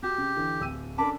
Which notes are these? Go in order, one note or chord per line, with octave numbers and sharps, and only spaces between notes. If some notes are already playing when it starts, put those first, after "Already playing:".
F#4 G4
C#3
D3 E3
D1 E6 D#7
C#4 D4 A4 A#4 A5 B5 D6